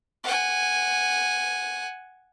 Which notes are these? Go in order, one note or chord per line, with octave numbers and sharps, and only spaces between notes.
F#5 G#5